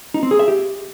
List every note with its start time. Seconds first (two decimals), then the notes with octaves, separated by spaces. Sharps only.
0.14 D#4
0.23 C4
0.31 G#4
0.39 E5
0.48 G4